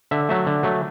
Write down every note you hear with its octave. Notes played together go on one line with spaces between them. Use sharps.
D3 E5
F#3 A3 E5
D3
F#3 A3